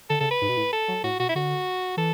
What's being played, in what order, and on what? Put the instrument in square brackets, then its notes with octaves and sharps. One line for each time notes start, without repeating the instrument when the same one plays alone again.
[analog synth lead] D3 [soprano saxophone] A4
[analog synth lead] C#3 [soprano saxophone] A4
[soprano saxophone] B4
[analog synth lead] G#2
B2
A2
[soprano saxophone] A4
[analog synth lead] F#3
[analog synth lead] A2 [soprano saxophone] F#4
[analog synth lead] B2 [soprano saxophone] F#4
[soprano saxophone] E4
[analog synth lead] D3 [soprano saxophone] F#4
[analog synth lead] E3 [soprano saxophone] A4